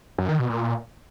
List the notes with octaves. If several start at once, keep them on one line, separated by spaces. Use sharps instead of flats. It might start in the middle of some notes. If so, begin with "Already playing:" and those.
F#2
D#3
B2
A#2